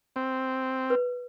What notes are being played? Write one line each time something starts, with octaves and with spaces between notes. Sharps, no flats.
C4
B4